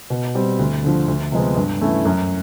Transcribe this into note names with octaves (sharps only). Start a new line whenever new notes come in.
B2
G3 C4
D2
D3 F3
D2
C3 F3 G#3 B3
G2
E3 A3 C#4 E4
F#2